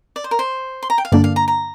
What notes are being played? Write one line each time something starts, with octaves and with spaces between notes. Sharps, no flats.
D5
C5
A#4
C5
C6
A#5
G5
F5
G2 D3 A#3 D4 D5
F5
A#5
A#5